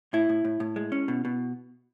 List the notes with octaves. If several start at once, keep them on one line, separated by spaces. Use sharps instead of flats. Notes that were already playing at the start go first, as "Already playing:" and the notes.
A2 E4
A2
A2
A2
G#3
C#4
B2
B2